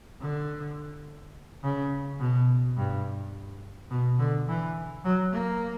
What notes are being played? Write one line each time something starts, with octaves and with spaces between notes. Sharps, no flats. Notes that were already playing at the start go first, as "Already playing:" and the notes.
D3
C#3
B2
G2
B2
D3
E3
F#3
A#3